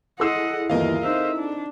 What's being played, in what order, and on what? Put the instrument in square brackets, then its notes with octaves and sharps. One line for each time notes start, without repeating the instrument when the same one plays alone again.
[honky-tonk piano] E4 G#4 A4 [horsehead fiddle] D#5 F#5 [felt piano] C6 E6 C7
[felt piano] G1 D#2 E3 [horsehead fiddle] F4 [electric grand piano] A#4 D#5 F5
[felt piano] C4 D#4 [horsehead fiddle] C5 E5
[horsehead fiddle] D4